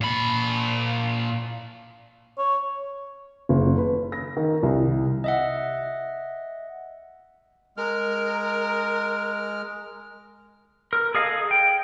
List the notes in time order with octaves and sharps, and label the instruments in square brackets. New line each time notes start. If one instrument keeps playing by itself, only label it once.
[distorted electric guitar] A#2 B5
[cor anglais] C#5
[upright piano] F#1
B4
A#6
D#3
C2
[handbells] D#5 E5 F#5
[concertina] G#3 F6 [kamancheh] A#4
[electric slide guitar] A#4
G#4 A4 D#5 F5
G5